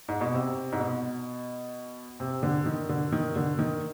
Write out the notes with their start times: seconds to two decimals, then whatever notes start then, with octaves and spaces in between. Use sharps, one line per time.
0.08 G#2
0.21 B2
0.34 C3
0.72 G#2
0.80 B2
2.20 C3
2.43 D3
2.66 D#3
2.89 D3
3.12 D#3
3.36 D3
3.59 D#3